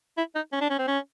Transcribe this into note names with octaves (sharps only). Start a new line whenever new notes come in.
E4
D#4
C#4
D4
C#4
C4
C#4